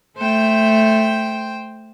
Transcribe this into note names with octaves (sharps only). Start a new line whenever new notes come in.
A3 C5 G5